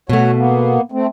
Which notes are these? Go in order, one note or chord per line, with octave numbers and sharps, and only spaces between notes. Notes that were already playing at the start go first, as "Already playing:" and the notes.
B2 A3 F#4 C#5
A#3 B3
A3 C4